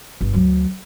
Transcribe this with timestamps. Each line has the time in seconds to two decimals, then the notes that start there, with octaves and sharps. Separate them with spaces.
0.21 G1
0.33 D2 F#3